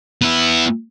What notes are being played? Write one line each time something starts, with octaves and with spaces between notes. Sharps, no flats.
B3 E4